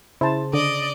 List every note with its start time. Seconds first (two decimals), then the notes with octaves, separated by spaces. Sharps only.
0.21 C#3 E4 C5 A5
0.53 D3 D5 D#5